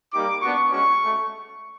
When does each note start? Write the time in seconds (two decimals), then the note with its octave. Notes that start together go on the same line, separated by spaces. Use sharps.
0.13 G3 A#3 D#4 G4 D6
0.42 B3 D4 F#4 C#6
0.71 G#3 C#4 F#4 C#6
1.01 A3